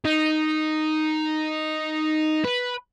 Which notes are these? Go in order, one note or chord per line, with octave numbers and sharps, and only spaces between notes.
D#4
B4